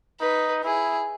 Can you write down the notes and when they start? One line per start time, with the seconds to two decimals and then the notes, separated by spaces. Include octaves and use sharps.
0.20 D#4 B4
0.64 E4 G#4